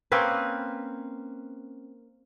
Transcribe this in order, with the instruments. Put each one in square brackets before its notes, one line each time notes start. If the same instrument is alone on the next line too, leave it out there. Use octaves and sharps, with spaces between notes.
[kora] A#3 C4 C#4 B4